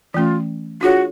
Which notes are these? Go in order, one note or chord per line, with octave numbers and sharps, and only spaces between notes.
E3 A3 C#4 F4
D4 F4 F#4 G#4 C#5